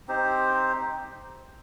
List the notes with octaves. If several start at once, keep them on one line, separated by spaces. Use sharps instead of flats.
C4 D#4 G4 C5